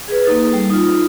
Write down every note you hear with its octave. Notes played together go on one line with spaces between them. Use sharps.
G#4 B4
A#3 D#4 A4
G3
D#4 F4